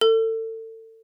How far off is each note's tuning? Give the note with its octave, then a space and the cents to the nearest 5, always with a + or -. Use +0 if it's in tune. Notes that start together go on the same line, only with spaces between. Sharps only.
A4 +30